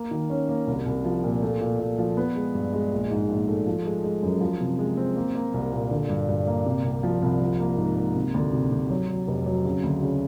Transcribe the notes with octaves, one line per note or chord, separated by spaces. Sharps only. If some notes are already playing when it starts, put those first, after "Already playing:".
Already playing: A#3
D#3
C#4
A#3
C2
C2
F3
A#2
A3
A#2
A#2
F3
B3
G#3
G2
G#3
A#1
G#2
A#1
A3
F3
G#3
G#3
F#2
F3
C3
G#3
C4
A#3
A#3
C2
A#2
D3
G2
G2
A#3
C3
C2
F3
C2
F3
A#3
G#2
A#3
C3
D2
C3
C3
F#3
F#3
F1
F#3
C#3
D2
C#3